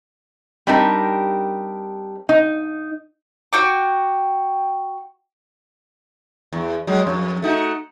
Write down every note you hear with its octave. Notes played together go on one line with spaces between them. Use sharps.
G3 C4 D4 D#4 G4 A#4
D#4
F#4 G5 D6
E2
F#3 G#3
F2
A3 D#4 F#4